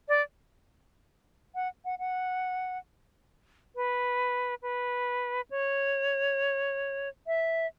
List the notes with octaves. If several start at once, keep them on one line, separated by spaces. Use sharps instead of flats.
D5
F#5
F#5
F#5
B4
B4
C#5
E5